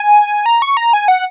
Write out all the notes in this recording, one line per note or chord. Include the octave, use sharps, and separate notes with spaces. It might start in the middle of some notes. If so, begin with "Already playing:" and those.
Already playing: G#5
A#5
C#6
A#5
G#5
F#5